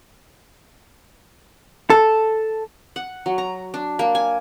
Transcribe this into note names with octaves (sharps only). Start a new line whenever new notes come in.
A4
F#5
F#3
A#5
D4
A#3
G#5